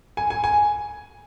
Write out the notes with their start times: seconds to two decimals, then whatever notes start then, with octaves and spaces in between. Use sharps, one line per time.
0.17 G#5
0.30 G#5
0.44 G#5